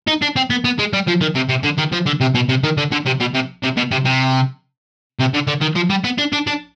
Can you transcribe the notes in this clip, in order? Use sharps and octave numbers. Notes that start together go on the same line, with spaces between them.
D#4
D4
C4
B3
B3
G#3
G3
F3
D#3
C3
C3
D3
D#3
F3
D3
C3
B2
C3
D#3
D3
D3
C3
B2
C3
C3
B2
C3
C3
C3
D3
D3
D#3
F3
G3
B3
D4
D4
D4